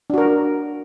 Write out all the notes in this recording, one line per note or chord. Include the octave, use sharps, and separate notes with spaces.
D4 F#4 A#4